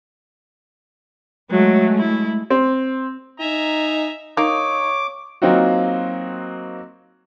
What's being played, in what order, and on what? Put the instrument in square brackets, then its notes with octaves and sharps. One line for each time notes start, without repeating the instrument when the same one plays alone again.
[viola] F#3 [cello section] G#3 A3
[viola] E4
[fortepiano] C4
[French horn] D#4 [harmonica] E5 G#5 A#5
[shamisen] A#3 [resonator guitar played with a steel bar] D#4 [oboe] C#5 [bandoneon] D6
[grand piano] F#3 A#3 C4 D#4 F4 F#4